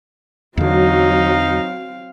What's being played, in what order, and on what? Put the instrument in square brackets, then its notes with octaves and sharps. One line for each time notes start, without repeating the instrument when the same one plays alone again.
[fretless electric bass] E2 D3 [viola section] F#3 [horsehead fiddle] C4 F5 [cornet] D#4